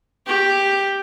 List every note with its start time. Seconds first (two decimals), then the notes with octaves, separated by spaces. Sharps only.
0.27 G4